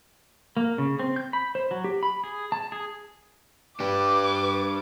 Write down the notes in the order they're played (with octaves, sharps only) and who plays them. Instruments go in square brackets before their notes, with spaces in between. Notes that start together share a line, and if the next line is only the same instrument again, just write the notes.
[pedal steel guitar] A#3
C#3
C4
G6
B5
C5
F#3
G4
B5
G#4
A5
G#4
[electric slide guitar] D4 G4 [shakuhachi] B4 [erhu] D6